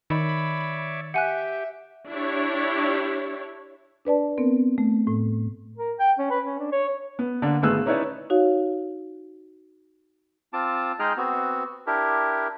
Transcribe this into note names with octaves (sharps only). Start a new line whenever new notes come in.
D#3 C#5 D5 E5 B5
G4 E5 F#5 G#5 F#6
D4 E4 G4 C#5
D4 B4 D5 A5
B3 C4 A#4
A3
A2
A#4
G5
C#4
B4
C#4
D4
C#5
B3
D3 A#3 D4
G#1 A3 B3 G#4 E6 F#6
C#4 D#4 E4 B4 C#5 D5
D#4 F#4 C#5 F5
C4 F4 A5 D6
G#3 D#4 G#4 D#5 G5 F6
B3 C4 F#4
D4 E4 G4 A#4